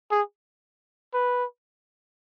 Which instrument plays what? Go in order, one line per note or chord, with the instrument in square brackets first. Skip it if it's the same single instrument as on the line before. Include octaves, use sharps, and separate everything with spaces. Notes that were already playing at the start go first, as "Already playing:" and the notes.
[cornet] G#4
B4